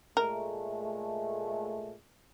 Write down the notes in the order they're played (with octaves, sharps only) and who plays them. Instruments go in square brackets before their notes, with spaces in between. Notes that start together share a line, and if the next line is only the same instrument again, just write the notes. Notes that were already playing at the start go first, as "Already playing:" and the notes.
[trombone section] A#2 G#3 A3 [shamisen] A#4